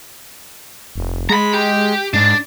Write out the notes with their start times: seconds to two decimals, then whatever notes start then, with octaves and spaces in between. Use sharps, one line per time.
0.95 F1
1.29 G#3 A#5 B5
1.54 G4
2.14 G#2 D4